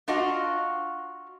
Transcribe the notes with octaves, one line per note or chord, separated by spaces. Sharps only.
D4 F4 F#4 D#5 F5